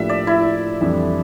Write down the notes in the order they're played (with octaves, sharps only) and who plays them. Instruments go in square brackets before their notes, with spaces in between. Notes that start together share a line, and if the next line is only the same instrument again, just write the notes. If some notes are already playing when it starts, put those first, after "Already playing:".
Already playing: [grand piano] A2 F3 A#3 D4 G4 [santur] E5
[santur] D5
E4
[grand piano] F2 E3 G3 D4 A4